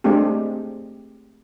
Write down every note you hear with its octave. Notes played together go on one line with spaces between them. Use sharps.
G#3 A3 C4 D4 G4